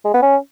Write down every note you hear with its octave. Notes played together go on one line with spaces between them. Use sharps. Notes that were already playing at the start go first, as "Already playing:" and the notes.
G#3
B3
C#4